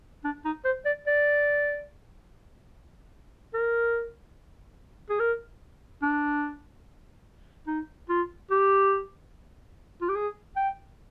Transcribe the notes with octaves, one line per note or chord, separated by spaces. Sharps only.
D4
D#4
C5
D5
D5
A#4
G#4
A#4
D4
D#4
F4
G4
F4
G4
G#4
G5